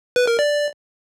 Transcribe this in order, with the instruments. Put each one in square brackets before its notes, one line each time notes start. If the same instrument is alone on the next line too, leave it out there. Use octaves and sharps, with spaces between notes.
[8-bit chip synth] B4
A#4
D5